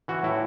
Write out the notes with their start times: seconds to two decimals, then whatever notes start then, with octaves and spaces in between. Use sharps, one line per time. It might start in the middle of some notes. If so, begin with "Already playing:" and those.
0.08 E3 F#4
0.23 A2 E4